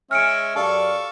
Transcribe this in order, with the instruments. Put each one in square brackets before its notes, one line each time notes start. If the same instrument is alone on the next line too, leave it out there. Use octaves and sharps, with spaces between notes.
[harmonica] G#3 C#4 E5 [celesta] F6 C#7 D7
[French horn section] F#2 G4 D5 [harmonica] A4 F5 C#6